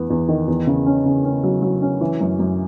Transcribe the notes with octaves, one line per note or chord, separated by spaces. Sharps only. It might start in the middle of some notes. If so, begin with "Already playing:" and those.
Already playing: E2 B3
E2
D#3
E2
C#3
C#4
C#3
C#4
F#3
F#3
C#4
E3
F#2
F#2